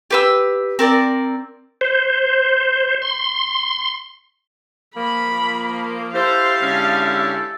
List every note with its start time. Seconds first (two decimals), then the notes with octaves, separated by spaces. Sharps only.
0.10 G4 B4 E6
0.79 C4 A#4 D5
1.81 C5
3.02 C6
4.97 F3 A#3 B5
6.15 E4 G4 A4 C5 F5
6.61 D3 G#3 C#4